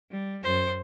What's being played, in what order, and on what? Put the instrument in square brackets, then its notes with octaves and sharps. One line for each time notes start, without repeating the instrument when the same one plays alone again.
[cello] G3
F#2 C5